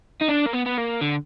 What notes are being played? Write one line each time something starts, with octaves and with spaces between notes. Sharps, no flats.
D#4
D4
A#3
B3
B3
A#3
D3